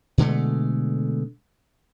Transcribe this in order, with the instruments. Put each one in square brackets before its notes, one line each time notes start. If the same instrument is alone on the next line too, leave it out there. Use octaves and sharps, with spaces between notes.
[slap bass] B2 D3 G#3 A3